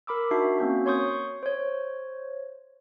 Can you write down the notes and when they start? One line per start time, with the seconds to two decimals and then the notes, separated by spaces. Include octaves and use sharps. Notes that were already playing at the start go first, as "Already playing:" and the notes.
0.07 A#4 B5 D6 E6
0.31 D4 D#4 F#4 E5 C7
0.59 A#3 C4 C#4 F#4
0.86 C#5 C6 C#6 D#6 G6
1.43 C5 C#5